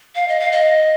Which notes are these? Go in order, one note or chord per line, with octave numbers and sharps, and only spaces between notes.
F5
D#5
F5
D#5